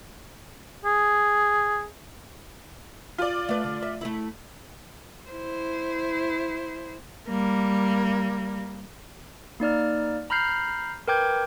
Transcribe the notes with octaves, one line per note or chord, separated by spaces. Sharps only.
G#4
F4 D5
A3 B4
D3
E5
A3 E4
E4 C5
G3 A#3
A#3 D#4 D5 F6
A#5 B5 F6 G6 C7
A#4 B4 G5 D6 G6 G#6